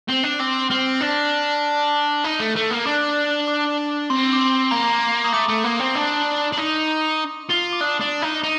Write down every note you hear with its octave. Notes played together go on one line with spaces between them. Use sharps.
C4
D4
C4 D6
C4 F6
D4 A#6
D#4
A3
A3
A#3
D4
D6
C4 C6
D6
C6
A#3 A#5
D#6
A3 D6
A3
A#3
C4
D4
D4
D#4
F4
D6
D4 D#6
D4
D#4
D#4